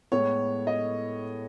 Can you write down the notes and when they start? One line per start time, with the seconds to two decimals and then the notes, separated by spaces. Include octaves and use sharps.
0.12 A2 G#3 B3 C#5
0.67 D#5